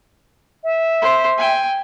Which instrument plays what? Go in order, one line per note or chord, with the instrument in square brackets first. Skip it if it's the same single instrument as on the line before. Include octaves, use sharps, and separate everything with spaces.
[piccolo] E5
[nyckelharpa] C5
G5 G#5